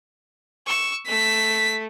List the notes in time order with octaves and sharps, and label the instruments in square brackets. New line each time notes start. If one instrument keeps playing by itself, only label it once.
[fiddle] C#6 E6
[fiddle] A3 [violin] B6